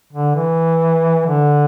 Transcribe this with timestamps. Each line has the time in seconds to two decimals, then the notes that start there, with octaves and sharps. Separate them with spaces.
0.13 D3
0.35 E3
1.26 D3